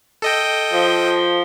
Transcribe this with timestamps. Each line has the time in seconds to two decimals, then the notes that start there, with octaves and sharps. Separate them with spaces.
0.22 A4 D#5 G5
0.73 F3